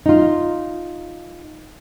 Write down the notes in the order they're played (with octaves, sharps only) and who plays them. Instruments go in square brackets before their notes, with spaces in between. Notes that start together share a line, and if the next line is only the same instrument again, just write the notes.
[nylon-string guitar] D#4 F4